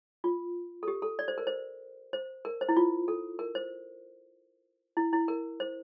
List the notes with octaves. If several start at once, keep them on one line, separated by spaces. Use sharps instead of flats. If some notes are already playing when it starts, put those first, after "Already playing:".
F4
A4
G4
A4
D5
C5
A#4
C5
C5
A#4
C5
E4
F4
A4
A#4
C5
E4
E4
A#4
C5